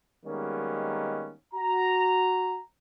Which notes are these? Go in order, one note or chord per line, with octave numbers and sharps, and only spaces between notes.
D#3 G3 G#3 A#3 B3 C#4
F#4 A#5